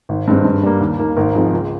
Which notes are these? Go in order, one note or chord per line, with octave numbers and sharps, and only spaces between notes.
G#1
G2 D#3 G#3 C4
G2
G3 A#3
D#2
D#3 A#3
G#1 A#4
G#2 F3 G#3 C4
C#2